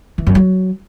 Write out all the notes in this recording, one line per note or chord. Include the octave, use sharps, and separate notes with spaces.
E3
F#2
F#3